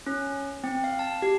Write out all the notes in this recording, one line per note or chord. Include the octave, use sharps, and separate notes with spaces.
C#4
C4
F5
A5
G4